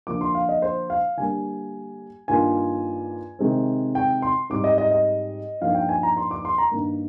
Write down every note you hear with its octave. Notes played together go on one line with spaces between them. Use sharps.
D3 F3 A#3 D6
C6
F5
D#5
C5
F5
D3 G3 A#3 G#5
G2 D#3 A#3 F4 G#5
C3 D#3 G#3 C4
G5
C6
G#2 G3 C4 D#4 D6
D#5
D#5
D#5
G2 F3 A#3 D#4 F5
G5
G#5
A#5
C6
D6
C6
A#5
G2 D#3 A#3